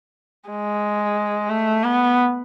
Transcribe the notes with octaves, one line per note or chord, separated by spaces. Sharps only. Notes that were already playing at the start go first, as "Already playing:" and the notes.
G#3
A3
B3